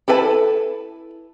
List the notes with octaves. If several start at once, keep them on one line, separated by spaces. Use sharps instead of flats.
E4 A4 B4 G#5 A5